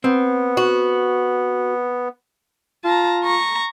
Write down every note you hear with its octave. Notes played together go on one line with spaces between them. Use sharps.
B3 C4
F#4
F4 A5 A#5
A#5 C#6